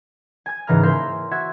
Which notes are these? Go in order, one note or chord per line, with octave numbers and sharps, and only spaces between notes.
G#5 G#6
G#2 C#3 E3 A#5 F6
A#3 A#4 E5 C6 G6
F#4 E5 G#6